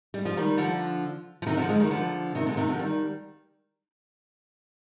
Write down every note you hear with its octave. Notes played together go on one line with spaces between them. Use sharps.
G3
F3
D#3 G3
D3 F3
F3
C3 D#3
D3 F3
F3 G#3
D#3 G3
D3 F3
C3 D#3
A#2 D3
C3 D#3
D3 F3
D#3 G3